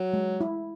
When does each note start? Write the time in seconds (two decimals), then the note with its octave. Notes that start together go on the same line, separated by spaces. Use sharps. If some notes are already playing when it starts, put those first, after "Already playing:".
Already playing: F#3
0.13 G#3
0.41 E4